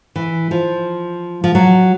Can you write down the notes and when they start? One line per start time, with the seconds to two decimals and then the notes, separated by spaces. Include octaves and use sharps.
0.16 E3
0.51 F3
1.44 F3
1.55 F#3